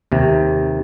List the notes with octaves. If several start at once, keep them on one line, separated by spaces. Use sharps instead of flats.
D#2 C3